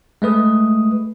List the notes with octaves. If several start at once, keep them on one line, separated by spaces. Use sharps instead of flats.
G#3 A3 B4 D#6